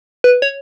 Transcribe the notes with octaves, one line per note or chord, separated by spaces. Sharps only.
B4
C#5